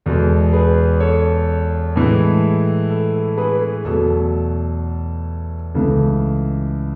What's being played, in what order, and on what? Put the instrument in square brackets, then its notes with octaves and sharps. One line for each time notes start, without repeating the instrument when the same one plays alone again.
[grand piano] E2 B2 G#3 A4
G#4 B4
A4 C#5
A2 E3 G#3
A4
A4
G#4 B4
G#4
E2 B2 F#3 A3 A4
C#2 C#3 E3 A3 A4